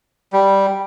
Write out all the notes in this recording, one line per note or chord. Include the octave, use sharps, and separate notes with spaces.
G3